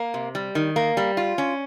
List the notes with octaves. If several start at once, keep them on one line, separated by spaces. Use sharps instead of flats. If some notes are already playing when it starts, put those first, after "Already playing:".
Already playing: A#3
C3
G3
D#3
A#3
G3
F4
C#4